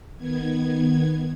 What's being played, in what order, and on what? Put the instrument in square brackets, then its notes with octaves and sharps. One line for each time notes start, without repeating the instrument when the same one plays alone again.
[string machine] D#3 B3 G#6